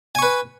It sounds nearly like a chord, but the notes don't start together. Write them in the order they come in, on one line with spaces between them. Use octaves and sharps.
G#5 C#6 B4